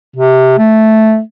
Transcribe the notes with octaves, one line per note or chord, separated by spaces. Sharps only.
C3
A3